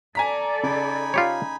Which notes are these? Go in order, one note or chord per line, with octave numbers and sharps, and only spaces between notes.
A4 D5 G#5 A#5 B6
C#3 D#4 G#5 B5
F4 G4 C#5